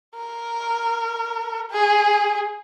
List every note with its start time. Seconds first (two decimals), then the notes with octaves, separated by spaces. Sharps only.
0.15 A#4
1.71 G#4